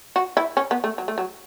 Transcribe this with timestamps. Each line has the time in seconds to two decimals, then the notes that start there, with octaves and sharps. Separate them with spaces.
0.16 F#4
0.37 E4
0.57 C#4
0.71 B3
0.84 A3
0.98 F#3
1.08 A3
1.18 F#3